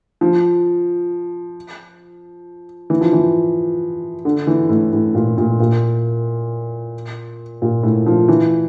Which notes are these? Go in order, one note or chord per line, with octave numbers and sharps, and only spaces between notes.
F3
E3
F3
E3
D3
E3
A2
A2
A#2
A#2
A#2
A#2
A2
F3
E3